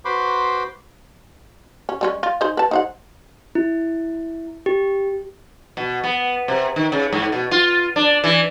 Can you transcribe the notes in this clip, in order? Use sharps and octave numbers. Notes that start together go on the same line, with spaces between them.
F#4 B4 C5 B5 C6 D6
C#4
G3 G#3 C#4
F4
D#4 G#4 C5
B4 A5
D#4 C5 F#5
E4
G4
B2
B3
C3
D#3
C#3
G#2
B2
F4
D4
E3